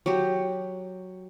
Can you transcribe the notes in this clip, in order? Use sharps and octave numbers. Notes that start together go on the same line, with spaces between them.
F#3 G4